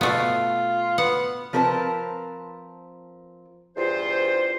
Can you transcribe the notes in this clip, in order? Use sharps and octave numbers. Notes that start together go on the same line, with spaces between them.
B2 A3 B3 F4
B3 F#5
F3 C4 A#4 B4 D5 A5
E2 G2 F4 C5